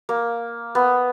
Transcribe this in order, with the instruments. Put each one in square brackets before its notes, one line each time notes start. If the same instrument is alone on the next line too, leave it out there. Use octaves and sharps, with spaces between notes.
[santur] A#3
B3